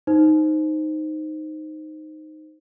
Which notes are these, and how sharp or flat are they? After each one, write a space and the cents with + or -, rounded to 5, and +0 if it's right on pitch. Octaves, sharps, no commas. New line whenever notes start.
D#4 +0 C5 +0